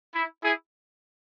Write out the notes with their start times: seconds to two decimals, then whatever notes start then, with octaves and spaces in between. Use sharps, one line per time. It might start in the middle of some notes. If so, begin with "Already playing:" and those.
0.14 E4
0.43 E4 G#4